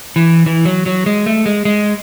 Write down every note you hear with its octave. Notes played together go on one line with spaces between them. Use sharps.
E3
E3
F#3
F#3
G#3
A3
G#3
G#3